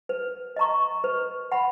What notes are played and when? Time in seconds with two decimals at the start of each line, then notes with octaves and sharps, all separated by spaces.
0.09 B4
0.56 D#5 A#5 C#6
1.04 B4
1.52 F#5 B5